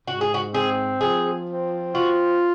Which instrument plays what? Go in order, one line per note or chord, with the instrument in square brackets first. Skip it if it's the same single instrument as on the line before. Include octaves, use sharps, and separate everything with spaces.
[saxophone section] G#2 [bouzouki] F#4
[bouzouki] G#4
F#4
[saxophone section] C4 [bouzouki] G#4
[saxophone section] F3 [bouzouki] G#4
[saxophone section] C4
[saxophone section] F4 [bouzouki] F#4